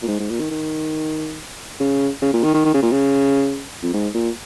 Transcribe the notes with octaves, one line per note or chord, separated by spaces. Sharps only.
A#2
G#2
G#2
A#2
D#3
D#3
C#3
C#3
A#2
D#3
D#3
D#3
C#3
A#2
C#3
F2
G#2
A#2